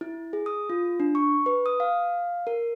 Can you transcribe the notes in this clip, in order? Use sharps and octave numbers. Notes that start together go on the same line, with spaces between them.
E4
G#4
D#6
F4
D4
C#6
B4
D#6
F5
A#4